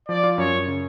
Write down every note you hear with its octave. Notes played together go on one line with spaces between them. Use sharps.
F3 D5
F4
F#2 C#5
F#2
C#3